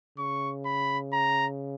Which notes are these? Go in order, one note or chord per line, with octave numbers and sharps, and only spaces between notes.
C#3 C#6
B5
A#5